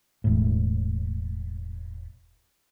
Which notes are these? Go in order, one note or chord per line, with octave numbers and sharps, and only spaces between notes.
E1 A2